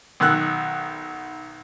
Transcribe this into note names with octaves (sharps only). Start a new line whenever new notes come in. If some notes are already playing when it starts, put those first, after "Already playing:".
B1 D#3 E6 F#6